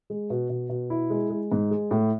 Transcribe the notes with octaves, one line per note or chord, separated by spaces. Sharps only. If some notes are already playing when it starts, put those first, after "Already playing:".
G#3
B2
B2
B2
E4
G#3
G#3
G#2
G#3
A2